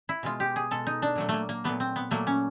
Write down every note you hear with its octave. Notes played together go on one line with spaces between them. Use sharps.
E4
B2 G#3 F4
G4
G#4
B2 G#3 A4
D#4
D4
A#2 F#3 A3
A3 A#3
A#3
A#2 F#3 A3 B3
C4
B3
A#2 F#3 A3 A#3
C#4